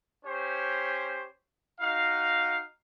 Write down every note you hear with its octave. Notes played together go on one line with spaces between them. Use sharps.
C#4 G4 C5 C#5
D#4 F#4 F5